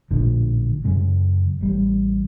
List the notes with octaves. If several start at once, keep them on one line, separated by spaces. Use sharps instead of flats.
A#1 A2 D3 F3
F#2 C#3 G#3
A1 G3